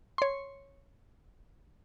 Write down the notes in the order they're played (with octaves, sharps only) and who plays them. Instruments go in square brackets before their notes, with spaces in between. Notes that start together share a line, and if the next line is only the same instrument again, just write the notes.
[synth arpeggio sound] C#5 C6